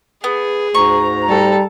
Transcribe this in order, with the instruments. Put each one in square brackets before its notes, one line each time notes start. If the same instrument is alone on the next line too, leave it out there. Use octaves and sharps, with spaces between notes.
[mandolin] B3 [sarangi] G#4
[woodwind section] D2 G#2 A#5 [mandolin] C#6
[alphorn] G3 [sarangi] A4